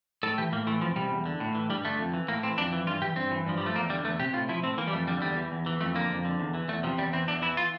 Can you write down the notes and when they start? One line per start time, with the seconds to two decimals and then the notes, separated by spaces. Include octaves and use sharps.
0.23 A2 A4
0.38 E3 G4
0.52 A2 A#3
0.67 E3 A3
0.81 F2 F3
0.96 C3 G3
1.11 E2
1.26 D3
1.40 A2
1.55 E3
1.70 G2 G3
1.85 D3 A3
1.99 F2
2.14 E3
2.28 A2 A#3
2.43 E3 C4
2.58 F2 D4
2.73 E3
2.87 G2 F4
3.02 E3 G4
3.16 G2 C4
3.31 E3
3.46 G2 F3
3.58 F3 G3
3.66 A3
3.75 E2 A#3
3.90 D3 G3
4.04 E2 A3
4.20 C3 G4
4.33 A2 F4
4.49 F3 E4
4.63 A2 C4
4.78 E3 A#3
4.87 G3
4.92 F2 A3
5.07 D3 G3
5.22 E2 G3
5.37 E3
5.52 E2
5.66 E3
5.81 F2 A3
5.95 D3 A#3
6.10 F2
6.25 D3
6.40 E2
6.54 E3
6.68 E2 A3
6.83 C3 F3
6.98 E2 G3
7.13 E3 C4
7.28 E2 D4
7.42 E3 E4
7.57 F4